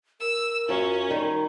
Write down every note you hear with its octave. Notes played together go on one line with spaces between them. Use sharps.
A#4 E6
F#2 C#4 F4
D#3 G3